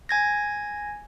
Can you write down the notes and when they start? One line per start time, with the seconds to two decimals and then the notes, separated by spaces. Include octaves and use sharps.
0.09 G#5 G#6 A#6